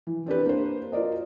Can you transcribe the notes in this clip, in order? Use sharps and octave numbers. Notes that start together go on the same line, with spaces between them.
E3
C4 D4 G4 B4
A#3 C5
F4 F#4 A#4 D5 D#5